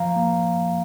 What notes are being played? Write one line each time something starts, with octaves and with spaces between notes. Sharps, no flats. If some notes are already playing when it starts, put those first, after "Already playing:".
Already playing: F3 F5 A#5
A#3